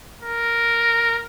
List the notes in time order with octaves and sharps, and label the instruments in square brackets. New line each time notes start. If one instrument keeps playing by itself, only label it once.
[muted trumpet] A#4